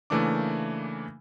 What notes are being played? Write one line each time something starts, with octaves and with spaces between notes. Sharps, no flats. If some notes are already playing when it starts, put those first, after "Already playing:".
C#3 E3 A3 A#3 D4 D6